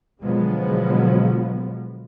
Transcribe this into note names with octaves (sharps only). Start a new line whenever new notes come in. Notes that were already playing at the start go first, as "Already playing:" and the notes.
B2 D3 F3 F#3 G#3 B3